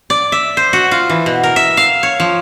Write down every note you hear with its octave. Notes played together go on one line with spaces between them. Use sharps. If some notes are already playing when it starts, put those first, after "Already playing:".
D5
E5
C5
F#4
F4
E3
B2
A#4
E5
F5
C#5
F3